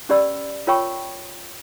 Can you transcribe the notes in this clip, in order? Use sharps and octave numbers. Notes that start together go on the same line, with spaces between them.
C#4 G4 B4 D5 B5 E6
F4 A#4 C#5 G5 B5 C#6